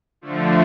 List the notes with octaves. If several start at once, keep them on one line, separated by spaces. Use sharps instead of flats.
D3 F3 A3